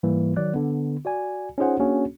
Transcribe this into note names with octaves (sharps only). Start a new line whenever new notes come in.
G#2 E3 G3 A#3
D#3 F#3 D5 F#6
D3 B3
F#4 D5 G#5
C#4 D#4 F4 G#4 C5 F#5
A#3 C#4 D4 F#4 G#4